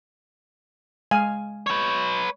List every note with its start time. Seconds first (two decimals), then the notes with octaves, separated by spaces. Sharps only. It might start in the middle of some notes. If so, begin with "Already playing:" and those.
1.11 G#3 F5 G#5
1.67 B4 C#5